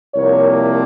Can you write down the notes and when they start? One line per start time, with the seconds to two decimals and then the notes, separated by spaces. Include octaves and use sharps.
0.15 C2 C3 F3 A#3 A#4 C#5